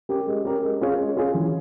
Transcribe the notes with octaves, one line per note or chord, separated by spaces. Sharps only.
C#4 G4 A#4
G#3
C#4 G4 A#4
G#3
C#4 F4 G#4 C#5
G#3
C#4 F4 G#4 C#5
E3